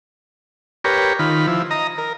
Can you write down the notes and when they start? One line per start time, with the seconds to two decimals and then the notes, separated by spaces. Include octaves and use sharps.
0.84 G4 A#4 B4 C#5
1.19 D#3 F4 B5
1.47 F3 E4
1.71 D#5 A#5
1.98 A#4